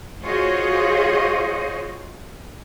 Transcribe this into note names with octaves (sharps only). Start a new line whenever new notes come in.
F4 F#4 G#4 C5 C#5 D#5